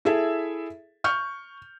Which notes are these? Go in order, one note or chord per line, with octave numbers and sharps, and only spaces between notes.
E4 G#4 A4 E5
C#6 F6 G6